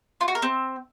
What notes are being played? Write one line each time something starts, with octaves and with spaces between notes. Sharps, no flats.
F4
F#4
A#4
C4